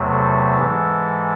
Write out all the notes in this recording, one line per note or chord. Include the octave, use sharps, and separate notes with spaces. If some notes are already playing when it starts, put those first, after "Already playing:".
Already playing: E2 C3 F#3 A3
A4
G#2 E3 G#3